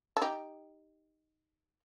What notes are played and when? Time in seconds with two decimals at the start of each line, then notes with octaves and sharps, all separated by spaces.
0.17 A4
0.22 D#4 G4